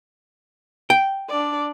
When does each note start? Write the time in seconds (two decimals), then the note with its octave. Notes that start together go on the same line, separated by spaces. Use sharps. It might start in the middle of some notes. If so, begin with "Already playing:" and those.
0.90 G5
1.29 D4 D5